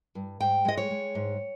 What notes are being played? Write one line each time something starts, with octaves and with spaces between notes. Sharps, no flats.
G2
G#2 G5
G#3 D#5
C#5
G#3
G#2